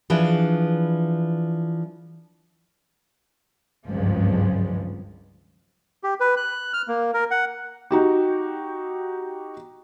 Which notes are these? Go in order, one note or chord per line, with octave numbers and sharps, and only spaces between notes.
E3 F3 D4 G#4
G#1 C#2 G2 F3 F#3 G#3
G4
B4
F#6
F6
A#3
A#4
F#5
D#4 F#4 G4